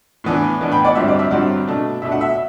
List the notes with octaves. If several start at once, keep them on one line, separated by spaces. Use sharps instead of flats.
A2 E3 B3 D4
A2 E3 B3 D4
G5 B5
D5 F#5
G2 D3 F#3 C4 E5
D5
E5
G2 D3 F#3 C4 D5 F#5
B2 A3 D4
B2 A3 D4 E5
F#5
E5